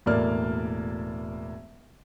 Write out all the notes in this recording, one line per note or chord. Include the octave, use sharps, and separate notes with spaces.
E1 A2 A#3 D5 F6